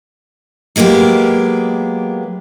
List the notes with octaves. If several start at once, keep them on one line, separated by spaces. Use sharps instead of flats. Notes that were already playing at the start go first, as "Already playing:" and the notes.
F#3 G#3 A#3 B3 G4